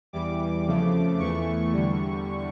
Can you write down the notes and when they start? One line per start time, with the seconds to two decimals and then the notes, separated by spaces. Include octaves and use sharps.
0.13 E2 E3 G3 D6
0.66 F2 C#3 F3 A3
1.19 E2 E3 A3 C#6
1.73 E2 D3 G3